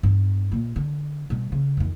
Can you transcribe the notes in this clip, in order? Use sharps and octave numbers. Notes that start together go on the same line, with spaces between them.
G2 B3
A#2 A#3
D3
B2 G3
C#3
F2 D#3